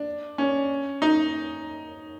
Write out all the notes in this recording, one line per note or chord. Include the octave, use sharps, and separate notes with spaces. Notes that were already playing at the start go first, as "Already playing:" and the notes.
Already playing: D4
C#4
D#4